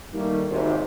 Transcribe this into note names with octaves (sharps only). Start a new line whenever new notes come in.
D#3 G3 A3 A#3
G#1 D#2 C3